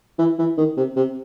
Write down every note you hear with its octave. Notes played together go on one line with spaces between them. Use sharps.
E3
E3
D#3
C3
C3